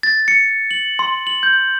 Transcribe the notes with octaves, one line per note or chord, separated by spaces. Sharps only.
A6
C#7
F#7
C6
F#7
G6